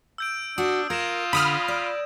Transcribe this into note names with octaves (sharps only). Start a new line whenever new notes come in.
E6 G6 D7
D4 F#4 D#6
F4 A#4 G#6 A#6 E7
D3 B5 D#6 F6
D5